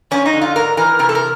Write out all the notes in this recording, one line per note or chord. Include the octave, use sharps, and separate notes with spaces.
F2 C#4
D#4
D3
F4
G#2 A#4
E3 A#4
C3 A#4
A4
A#4